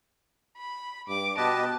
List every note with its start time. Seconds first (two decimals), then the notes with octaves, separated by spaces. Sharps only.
0.57 B5
1.08 G2 D6
1.37 B2 G4 B4 D#5 A5